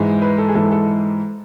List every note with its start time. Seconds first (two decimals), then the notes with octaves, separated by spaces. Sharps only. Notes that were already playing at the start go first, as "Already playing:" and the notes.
Already playing: G#2 E3 G#3
0.22 B4
0.38 A4
0.48 G#4
0.55 G#2 E3 G#3 A4
0.71 A4